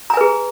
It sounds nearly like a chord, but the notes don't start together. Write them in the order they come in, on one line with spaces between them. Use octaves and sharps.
A#5 G#5 B4 G#4